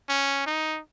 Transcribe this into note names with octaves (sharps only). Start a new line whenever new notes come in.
C#4
D#4